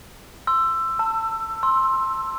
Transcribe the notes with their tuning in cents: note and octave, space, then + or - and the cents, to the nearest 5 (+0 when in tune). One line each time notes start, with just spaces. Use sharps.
C6 +0 E6 +15
A5 +25 E6 +30
C6 +15 E6 +0